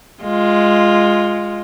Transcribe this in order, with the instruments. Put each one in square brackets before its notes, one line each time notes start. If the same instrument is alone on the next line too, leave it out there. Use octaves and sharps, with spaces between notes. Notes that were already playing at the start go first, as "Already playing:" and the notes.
[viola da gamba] G#3 F4